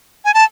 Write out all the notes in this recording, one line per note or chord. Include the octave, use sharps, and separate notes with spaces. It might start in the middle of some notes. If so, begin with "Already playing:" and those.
G#5
A5